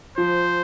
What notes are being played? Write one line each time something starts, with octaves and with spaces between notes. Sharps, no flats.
F3 C5